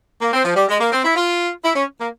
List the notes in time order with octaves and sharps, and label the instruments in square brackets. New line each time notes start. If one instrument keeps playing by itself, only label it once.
[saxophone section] A#3
C4
F3
G3
G#3
A#3
C4
E4
F4
E4
C#4
A#3